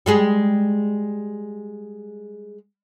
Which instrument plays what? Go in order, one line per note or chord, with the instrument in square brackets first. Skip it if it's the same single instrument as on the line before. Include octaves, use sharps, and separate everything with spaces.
[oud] G3 G#3 G#4